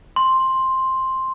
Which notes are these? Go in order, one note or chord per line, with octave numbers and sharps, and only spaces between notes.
C6